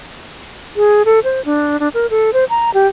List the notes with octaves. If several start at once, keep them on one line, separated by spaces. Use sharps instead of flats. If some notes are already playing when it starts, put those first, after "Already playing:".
G#4
A4
C5
D4
D4
A#4
A4
C5
A#5
G4